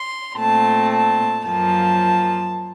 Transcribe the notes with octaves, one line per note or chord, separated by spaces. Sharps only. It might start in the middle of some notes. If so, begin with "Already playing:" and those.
Already playing: C6
A#2 A3 C4 A5
A5
F#2 F3 A#3 A5